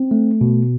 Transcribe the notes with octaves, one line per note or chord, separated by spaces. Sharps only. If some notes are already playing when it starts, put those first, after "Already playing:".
Already playing: C4
A3
B2